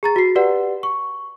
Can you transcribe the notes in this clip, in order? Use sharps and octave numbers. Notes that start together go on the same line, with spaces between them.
G#4 A#5 A6
F#4 C7
G4 B4 D5 F#5
C#6